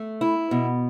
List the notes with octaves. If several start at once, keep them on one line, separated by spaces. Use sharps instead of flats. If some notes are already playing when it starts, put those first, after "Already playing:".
Already playing: A3
E4
B2